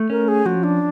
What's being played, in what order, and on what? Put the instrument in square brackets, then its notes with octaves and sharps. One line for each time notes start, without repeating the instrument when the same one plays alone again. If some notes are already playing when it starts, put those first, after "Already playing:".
Already playing: [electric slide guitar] A3
[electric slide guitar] C#4 [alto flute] A#4
[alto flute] G#4
[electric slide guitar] F3 [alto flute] F#4
[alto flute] D4